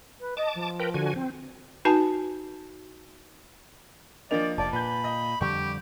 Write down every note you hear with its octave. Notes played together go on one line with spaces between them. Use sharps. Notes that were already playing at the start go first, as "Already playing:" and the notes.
B4
D#5 A5 D6
F3
A#4 B4 G5
D3 F#4 G#5
C4
D#4 F#4 B4 G#5 A5
F3 A#3 D4 A#4 D5 D#5 F7
F1 D5 A5
A#2 B4 B5 G6
D#5
F2 D3 G3 G4 C#6